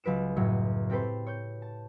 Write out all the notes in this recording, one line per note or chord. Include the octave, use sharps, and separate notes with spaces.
C#2 F#3 B4 D7 E7
F#2 A2 F#3
C4 G4 A4 B4 C5
C#5 G6
A5